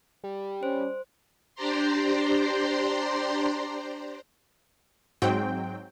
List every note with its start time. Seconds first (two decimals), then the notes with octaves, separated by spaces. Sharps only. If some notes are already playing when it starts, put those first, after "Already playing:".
0.24 G3
0.63 C#4 C5
1.55 D4 G4 C5 D5 A#5 C6
5.22 G#2 F#3 C4 G5